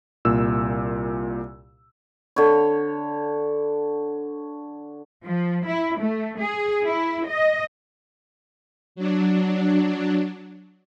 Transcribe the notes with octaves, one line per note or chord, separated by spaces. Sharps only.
C2 A#2 E6
D3 C#5
F3
E4
A3
G#4
E4
D#5
F#3 D4